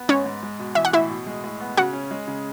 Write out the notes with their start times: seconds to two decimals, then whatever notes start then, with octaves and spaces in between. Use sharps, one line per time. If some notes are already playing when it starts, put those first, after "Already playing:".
Already playing: B3
0.09 G#2 C#4 C#5
0.26 G#2
0.43 G#3
0.59 B2
0.75 E3 E5
0.85 F#5
0.93 A2 E4 E5
1.09 B2
1.27 G#3
1.44 A2
1.60 B3
1.77 C#3 F#4 F#5
1.93 C#4
2.11 G#3
2.28 C#3